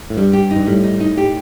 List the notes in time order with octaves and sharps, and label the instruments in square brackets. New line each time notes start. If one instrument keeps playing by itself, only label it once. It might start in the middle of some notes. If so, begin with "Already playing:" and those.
[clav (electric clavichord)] A2
[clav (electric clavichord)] G2 [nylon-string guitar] G3
[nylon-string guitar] G4
D#4
[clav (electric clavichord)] G2
[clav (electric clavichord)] A2 [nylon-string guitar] G3
[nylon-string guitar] D#4
D#4
G4